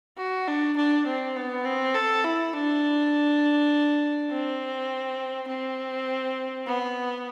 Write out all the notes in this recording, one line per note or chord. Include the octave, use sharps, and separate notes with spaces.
F#4
D4
D4
C4
B3
C4
A4
E4
D4
C4
C4
B3